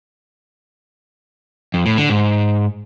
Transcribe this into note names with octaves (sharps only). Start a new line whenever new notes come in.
F2
A2
D3
G#2